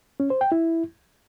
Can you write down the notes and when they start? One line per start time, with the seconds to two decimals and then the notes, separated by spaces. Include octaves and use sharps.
0.20 C#4
0.30 C5
0.41 G5
0.52 E4